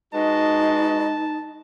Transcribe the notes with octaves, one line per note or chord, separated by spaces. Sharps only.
G#3 D#4 F#4 B4 D#5 A5